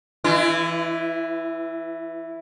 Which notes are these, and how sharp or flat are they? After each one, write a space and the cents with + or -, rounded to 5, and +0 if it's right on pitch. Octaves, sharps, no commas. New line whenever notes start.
E3 +0 E4 +40